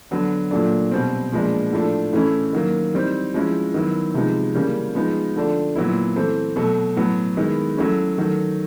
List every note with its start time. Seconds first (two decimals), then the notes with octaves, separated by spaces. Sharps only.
0.11 D3 F#3 B3 D4
0.51 A#2 F#3 A3 D4
0.91 B2 G3 C4
1.32 A#2 F3 G#3 B3 D4
1.72 A2 F3 A3 D4
2.13 A2 E3 A3 C#4 E4
2.53 D#3 F#3 A#3
2.94 E3 G3 C4 D#4
3.34 F3 G#3 C#4 E4
3.74 D#3 F#3 B3 E4
4.14 C3 F3 G#3 B3 D#4
4.54 C#3 E3 G3 A#3 C#4
4.95 F3 G#3 B3 D#4
5.36 D3 F3 A3 D4
5.76 A#2 F#3 B3 E4
6.16 E3 A3 C4
6.56 B2 F#3 A3
6.96 A2 F#3 B3
7.37 D#3 G#3 B3 E4
7.77 F#3 A3 C#4 E4
8.18 D#3 F#3 A3